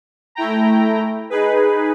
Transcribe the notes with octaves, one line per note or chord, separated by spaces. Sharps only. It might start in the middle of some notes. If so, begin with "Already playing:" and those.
A3 E4 G5 A#5
D#4 G#4 B4